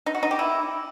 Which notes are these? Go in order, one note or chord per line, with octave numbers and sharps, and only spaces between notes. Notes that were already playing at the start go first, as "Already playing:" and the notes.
D#4
F#4
D#4
G4
E4